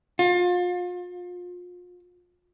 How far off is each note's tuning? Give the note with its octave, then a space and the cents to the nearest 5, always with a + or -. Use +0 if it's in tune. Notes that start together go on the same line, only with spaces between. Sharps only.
F4 +35